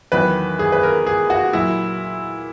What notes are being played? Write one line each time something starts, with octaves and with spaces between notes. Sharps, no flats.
E2 D#3 F#3 B4
G#4
B4
A#4
G#4
F#4
A#2 F#3 E4